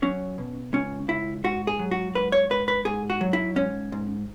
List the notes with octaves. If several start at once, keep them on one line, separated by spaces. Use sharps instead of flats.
F#3 C#4
B2
C#2 C#4
C#2 E4
G#2 F#4
G#4
F#3
F#4
G#2 B4
C#5
G#2 B4
B4
G#2 G#4
F#4
F#3
E4
G#2 C#4
G#2